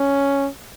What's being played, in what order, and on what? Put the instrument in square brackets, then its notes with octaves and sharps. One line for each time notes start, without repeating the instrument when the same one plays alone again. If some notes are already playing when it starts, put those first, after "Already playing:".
Already playing: [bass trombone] C#4